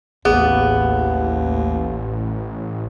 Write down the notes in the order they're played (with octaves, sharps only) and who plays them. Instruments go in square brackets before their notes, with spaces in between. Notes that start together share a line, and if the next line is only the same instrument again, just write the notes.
[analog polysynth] A1 [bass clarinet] D#2 [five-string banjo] B3 [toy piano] G#4